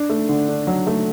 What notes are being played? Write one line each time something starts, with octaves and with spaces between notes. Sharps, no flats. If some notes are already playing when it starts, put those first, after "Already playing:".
Already playing: D4
A3
D3
D4
F#3
A3